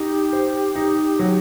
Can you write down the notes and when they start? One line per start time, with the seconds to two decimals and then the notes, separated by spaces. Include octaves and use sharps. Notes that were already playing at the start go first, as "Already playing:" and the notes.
Already playing: D#4 G4
0.33 C5
0.75 D#4
1.19 F#3